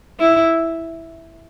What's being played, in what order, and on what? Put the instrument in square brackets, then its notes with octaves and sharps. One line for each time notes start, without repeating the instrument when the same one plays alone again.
[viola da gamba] E4